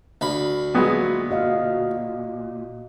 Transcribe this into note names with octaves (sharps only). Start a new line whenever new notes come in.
D2 B5
A#2 F#3 G#3 B3
F#4 D#5 F5